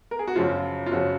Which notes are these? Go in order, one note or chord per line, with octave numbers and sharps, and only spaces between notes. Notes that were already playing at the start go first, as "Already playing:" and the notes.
A#4
G#4
F#4
F#2 C#3 F3 F4
F4
F#2 C#3 F3 F#4